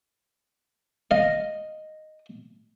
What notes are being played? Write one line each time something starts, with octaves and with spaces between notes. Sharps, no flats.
D#5 F5